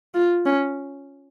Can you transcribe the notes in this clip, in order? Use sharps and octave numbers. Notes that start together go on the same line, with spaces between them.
F4
C#4